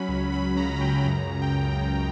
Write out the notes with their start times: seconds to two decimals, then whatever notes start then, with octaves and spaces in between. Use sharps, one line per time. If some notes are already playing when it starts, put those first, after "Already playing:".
Already playing: F#3 C#4 B5
0.08 C#2
0.32 F#3 B5
0.56 C#3 A#5
0.76 A#5
0.81 C#2 G5
1.05 F#2 A#5
1.29 C#3
1.42 G5
1.53 F#2
1.78 C#3